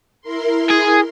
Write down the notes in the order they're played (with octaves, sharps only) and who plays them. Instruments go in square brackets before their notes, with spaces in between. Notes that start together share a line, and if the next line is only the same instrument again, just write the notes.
[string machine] E4 A#4 C6
[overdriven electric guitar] G#4